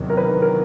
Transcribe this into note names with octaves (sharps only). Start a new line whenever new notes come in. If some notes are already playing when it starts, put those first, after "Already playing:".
Already playing: E2 C3 D#3 F#3
A#4
B4
A#4